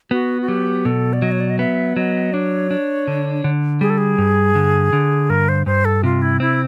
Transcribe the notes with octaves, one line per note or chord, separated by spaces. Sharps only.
B3 F#4
F#4
F#3 G4
B2 A4
D5
F#3 D#5
C#5
D5
D#5
B3 E5
F#3 D#5
D4 C#5
D4
D3
D3
G3 G#4
A4
G#4
G2
D3
D3
G2 A#4
C5
G2 C5
A4
C3 F4
E4
C4 E4